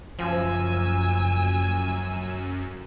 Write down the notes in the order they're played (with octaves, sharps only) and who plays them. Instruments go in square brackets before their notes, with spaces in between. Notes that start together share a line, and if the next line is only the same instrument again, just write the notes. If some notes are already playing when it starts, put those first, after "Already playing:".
[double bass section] F#1 [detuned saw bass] F#2 [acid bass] F3 [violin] G#5 E6